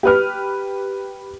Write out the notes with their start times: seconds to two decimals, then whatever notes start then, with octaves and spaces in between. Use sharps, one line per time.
0.03 G4 B4 F6